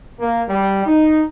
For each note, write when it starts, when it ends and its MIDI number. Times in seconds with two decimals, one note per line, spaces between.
0.20 0.42 58
0.49 0.84 55
0.86 1.22 63